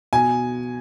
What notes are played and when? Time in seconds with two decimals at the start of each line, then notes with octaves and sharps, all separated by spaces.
0.13 B2 G#5